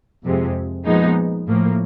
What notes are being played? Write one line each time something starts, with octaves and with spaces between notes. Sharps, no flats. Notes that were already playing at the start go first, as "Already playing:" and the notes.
F2 C3 F3 G#3
A#2 F3 G#3 B3 D#4
A2 F3 A#3